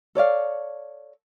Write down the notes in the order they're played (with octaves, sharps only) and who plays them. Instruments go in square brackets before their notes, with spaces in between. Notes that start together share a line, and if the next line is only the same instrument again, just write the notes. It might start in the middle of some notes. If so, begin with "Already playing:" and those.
[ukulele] A4 C#5 D5 F5